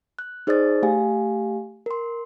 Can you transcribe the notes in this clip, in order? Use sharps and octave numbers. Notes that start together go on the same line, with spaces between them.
F#6
D#4 G#4 C5 D5 D#6 A6
A3 G4 F5 G#5
A#4 C6